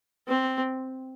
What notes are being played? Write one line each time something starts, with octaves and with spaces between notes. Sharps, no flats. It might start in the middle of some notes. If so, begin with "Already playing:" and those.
C4